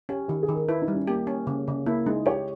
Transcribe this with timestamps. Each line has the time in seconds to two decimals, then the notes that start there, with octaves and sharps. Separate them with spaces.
0.09 C#4 G4
0.28 D#3 G4
0.43 G#4
0.49 D#3
0.55 A#4
0.68 E4 B4
0.82 D#4
0.88 G3
0.94 C#4
1.07 A#3 G4
1.27 C#4
1.47 C#3
1.68 C#3
1.86 A#3 E4
2.06 G#3 D#4
2.26 G4 C#5